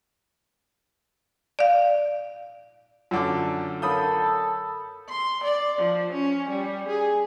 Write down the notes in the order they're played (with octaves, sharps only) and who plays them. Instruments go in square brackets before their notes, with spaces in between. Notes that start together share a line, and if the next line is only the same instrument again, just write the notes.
[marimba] D5 F5
[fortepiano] F#2 D3 D6 [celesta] F4
[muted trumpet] A4 [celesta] A#4 C#5 F5 [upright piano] B5 D#6 G6
[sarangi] C6
D5
F3
C#4
G3
G#4